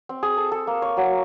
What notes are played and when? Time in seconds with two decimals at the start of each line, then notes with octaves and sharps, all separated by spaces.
0.09 C4
0.23 G#4
0.37 A4
0.52 A4
0.67 A#3
0.82 C#5
0.97 F#3